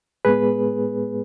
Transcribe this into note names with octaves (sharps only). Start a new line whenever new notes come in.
A2 G#3 B3 G#4 B4